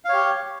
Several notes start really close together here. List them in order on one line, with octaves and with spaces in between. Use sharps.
F5 C#5 G4